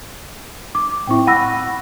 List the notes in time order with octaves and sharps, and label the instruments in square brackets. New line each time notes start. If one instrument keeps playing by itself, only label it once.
[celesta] D6
[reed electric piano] A2 C4 E4 [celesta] G5 C#6
[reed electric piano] F#5 B5 [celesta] E6 A#6 D#7